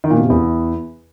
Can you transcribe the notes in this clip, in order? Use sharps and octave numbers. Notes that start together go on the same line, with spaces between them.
D#3
A#2
B2
C3
E2